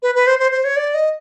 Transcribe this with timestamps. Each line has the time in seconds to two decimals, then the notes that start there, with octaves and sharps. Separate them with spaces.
0.02 B4
0.15 B4
0.27 C5
0.39 C5
0.51 C5
0.64 C#5
0.76 D5
0.94 D#5